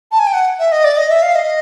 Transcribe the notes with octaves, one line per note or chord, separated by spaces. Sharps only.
A5
G#5
G5
F#5
E5
D#5
D5
D#5
E5
F5
D#5